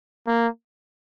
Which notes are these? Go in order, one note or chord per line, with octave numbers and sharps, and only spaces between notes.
A#3